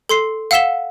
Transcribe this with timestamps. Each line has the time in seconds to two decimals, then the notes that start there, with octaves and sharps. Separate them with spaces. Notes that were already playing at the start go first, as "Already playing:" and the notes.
0.09 A4 C6 C7
0.51 F5 F#5 E6 B6 E7 G7